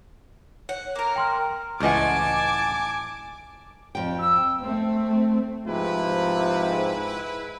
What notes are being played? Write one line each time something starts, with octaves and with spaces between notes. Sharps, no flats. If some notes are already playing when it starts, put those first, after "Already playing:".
C#5 F#5
A#3 A#4
G5 C6 F6
C#2 A2 E3 D#5 F#5 G#5 A5 D6
F2 G5
E6
A3 C4
G#2 C3 F3 E4 B4